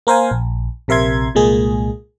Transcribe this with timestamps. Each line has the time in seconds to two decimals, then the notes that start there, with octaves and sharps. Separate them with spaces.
0.07 A#3 A#4 C5 F5 G#5
0.31 A#1
0.88 A#1 C3 A#4 E5 C6 G#6
1.35 C2 A#2 G#3 A#3 G#4